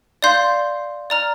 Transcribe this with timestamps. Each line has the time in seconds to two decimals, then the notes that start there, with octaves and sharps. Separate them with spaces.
0.22 D5 F5 C6 G6
1.10 D5 A#5 F6